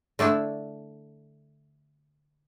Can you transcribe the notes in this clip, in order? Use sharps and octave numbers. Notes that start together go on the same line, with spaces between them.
D3 A3 D4 E4